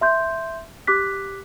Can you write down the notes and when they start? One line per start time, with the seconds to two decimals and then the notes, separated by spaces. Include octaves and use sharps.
0.01 E5 C6 G6
0.87 G4 D6 F#6 B6